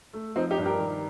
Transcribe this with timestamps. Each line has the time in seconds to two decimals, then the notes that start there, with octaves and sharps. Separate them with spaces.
0.13 A3
0.36 F3 C4 D#4
0.51 D#4 G4
0.58 G2
0.65 G4 A#4
0.80 D#3